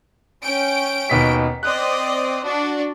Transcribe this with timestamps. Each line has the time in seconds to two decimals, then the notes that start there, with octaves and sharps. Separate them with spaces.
0.43 C#4 G5 D7
1.09 D#2 B2 B6
1.63 C4 D5 D#5 F#6
2.43 D4 F#4